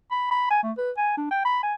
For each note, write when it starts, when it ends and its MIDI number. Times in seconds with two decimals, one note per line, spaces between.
0.12 0.31 83
0.31 0.49 83
0.50 0.60 80
0.64 0.72 57
0.78 0.91 71
0.98 1.13 80
1.17 1.28 62
1.31 1.43 79
1.45 1.62 83
1.63 1.74 80